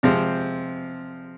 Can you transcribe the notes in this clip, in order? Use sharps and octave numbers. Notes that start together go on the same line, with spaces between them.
C3 F3 G#3 C4